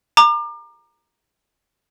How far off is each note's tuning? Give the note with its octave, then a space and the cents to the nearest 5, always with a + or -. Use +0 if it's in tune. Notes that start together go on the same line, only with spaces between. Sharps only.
A#5 +0 D6 +35